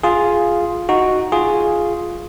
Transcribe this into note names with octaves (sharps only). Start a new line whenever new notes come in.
F4 G#4
D#4 F#4
F4 G#4